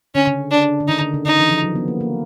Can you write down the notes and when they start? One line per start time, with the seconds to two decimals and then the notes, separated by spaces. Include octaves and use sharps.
0.15 D3 C#4
0.27 C#3
0.51 D4
0.80 D3
0.88 D#3 D#4
1.01 D3
1.14 C#3
1.26 D3 D#4
1.38 E3
1.50 F3
1.63 F#3
1.75 B3
1.88 A#3
2.01 A#3